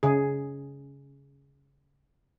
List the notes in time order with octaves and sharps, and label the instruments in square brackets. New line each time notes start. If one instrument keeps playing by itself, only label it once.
[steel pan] C#3 G#4